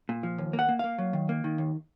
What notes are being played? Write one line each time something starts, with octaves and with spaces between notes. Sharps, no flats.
A#2
F3
D#2
A#3
F#5
A#3
A#3 F5
F#3
D#3
A#3
D#3
D#2